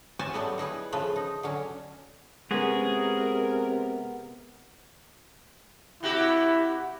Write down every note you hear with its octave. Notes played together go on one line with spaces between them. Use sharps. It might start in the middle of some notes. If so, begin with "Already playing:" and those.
C#4 F#4 C5 E5 G#5 A5
F#3 G3 A3 B3 B4
D#4 E4 G#4 B4
C#3 F3 A3 F4 B4
D#4
D3 F#3 C#4
C3 G#3 B3 C#4 F#4 G#4 A#4
C3 E4 F#4 G4